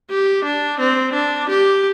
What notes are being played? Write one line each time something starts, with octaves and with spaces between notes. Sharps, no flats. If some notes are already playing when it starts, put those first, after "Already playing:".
G4
D4
C4
D4
G4